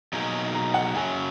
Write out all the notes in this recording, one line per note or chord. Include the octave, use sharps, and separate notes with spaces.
B2 F#3 A#3 D#4 G#4
A#5
F#5
F#2 C#3 F#3 G#5